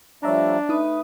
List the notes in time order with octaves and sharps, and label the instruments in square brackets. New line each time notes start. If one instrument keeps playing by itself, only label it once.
[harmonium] F3 G3 A3 [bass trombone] D4 [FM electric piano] C#5 E5 A#5
[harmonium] A3 B4 [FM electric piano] D#4 D#6